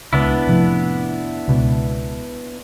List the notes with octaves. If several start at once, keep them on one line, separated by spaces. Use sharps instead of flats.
C#2 B3 D4 E4
F1 F2 A2
C#2 B2